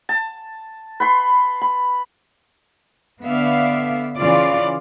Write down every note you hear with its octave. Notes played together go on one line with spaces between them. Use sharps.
A5
B4 B5 C6
B5
D3 B3 D5 E5 F5
C#3 E3 C#4 F4 D5 F5